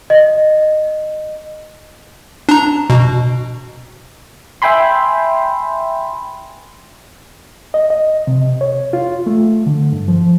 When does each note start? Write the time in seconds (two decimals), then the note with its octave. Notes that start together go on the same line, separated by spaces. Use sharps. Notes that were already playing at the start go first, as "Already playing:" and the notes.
0.10 D#5
2.49 D4 A#5
2.90 B2
4.62 E5 G5 G#5 B5 C6
7.74 D#5
7.90 D#5
8.27 C3
8.61 C#5
8.93 F4
9.26 A3
9.66 D3
9.92 G2
10.08 F3